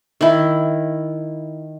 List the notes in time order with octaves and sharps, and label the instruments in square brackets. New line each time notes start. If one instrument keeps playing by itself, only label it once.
[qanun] D#3 E4